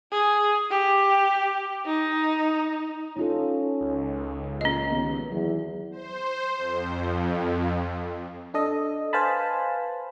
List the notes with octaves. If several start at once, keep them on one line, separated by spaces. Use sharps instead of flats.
G#4
G4
D#4
C#4 D#4 F4 A4
C#2
A#2 C#4 D#5
D#2 D#3 B3
E2 F#3
C5
F2
D4 A4 D#5
B4 C5 F5 G#5 A5 B5